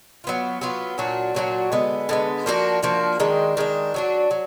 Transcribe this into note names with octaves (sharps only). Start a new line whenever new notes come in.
F#3 B3 F4
F#3 B3 F4
A#2 F#3 D4 F#4
A#2 F#3 D4 F#4
D3 G#3 B3
D3 G#3 B3
F3 A#3 D4 F#4
F3 A#3 D4 F#4
D#3 G#3 D4
D#3 G#3 D4
F#3 D4 F#4
F#3